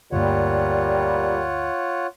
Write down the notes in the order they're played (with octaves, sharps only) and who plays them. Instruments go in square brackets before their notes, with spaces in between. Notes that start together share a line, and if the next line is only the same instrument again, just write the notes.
[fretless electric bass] D2 G2 A#3 [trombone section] A#2 G3 [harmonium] F4 C#5 F#5